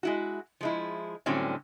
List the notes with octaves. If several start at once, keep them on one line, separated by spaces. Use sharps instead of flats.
G#3 E4 F#4
F3 G#3 E4
A2 D3 F#3 G3 C4 C#4